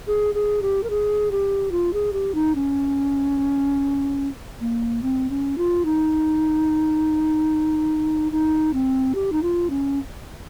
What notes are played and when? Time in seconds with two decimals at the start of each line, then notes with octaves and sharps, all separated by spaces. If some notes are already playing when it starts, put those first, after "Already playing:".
0.07 G#4
0.34 G#4
0.62 G4
0.83 A#4
0.90 G#4
1.31 G4
1.72 F4
1.93 G#4
2.13 G4
2.35 D#4
2.55 C#4
4.60 A#3
5.02 C4
5.30 C#4
5.58 F4
5.85 D#4
8.32 D#4
8.74 C4
9.15 G4
9.32 D#4
9.43 F4
9.70 C#4